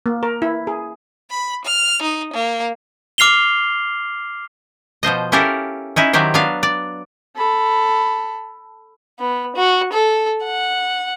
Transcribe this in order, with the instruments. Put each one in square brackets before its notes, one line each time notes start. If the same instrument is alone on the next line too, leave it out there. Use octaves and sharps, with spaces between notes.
[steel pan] A#3
A#4
E4
G#4
[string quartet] B5
F6
D#4
A#3
[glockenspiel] D6 F6 C7 F7 G7
[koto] B2 F3 C5 D#5
C#4 E4 G4 A4 A#4 F5
C#4 D#4 E4
D#3 F#3 E4 G4 C5
F#3 B3 D4 F5
D5
[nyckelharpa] A4 B5
[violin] B3
F#4
A4
F#5